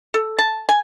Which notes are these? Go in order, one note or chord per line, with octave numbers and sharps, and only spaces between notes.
A4
A5
G#5